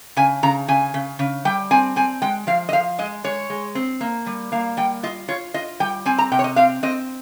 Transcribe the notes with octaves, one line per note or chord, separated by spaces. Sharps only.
C#3 G#5
C#3 A#5
C#3 G#5
C#3
C#3
G3 G5
C4 G#5
C4 G#5
G#3 G5
F3 F5
D#5
F3 F5
G#3 D#5
G#3 C#5
G#3
C4
A#3
G3
A#3 F5
G3 G5
F4 D#5
F4 C#5
F4 D#5
G3 G5
C4 G#5
A#5
C3 G5
C#5
D#5
C4 F5
C4 D#5